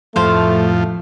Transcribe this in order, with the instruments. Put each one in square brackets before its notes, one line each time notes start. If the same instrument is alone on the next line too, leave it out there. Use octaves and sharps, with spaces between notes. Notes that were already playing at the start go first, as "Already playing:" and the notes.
[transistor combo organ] F2 A2 F3 [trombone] A3 [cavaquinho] C5 F5